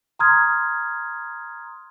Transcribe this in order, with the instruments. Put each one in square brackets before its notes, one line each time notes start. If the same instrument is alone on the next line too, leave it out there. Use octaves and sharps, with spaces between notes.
[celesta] A#5 C6 D#6 F6 G#6